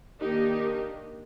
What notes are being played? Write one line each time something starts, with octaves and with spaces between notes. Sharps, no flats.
D#3 A#3 D4 D#4 G4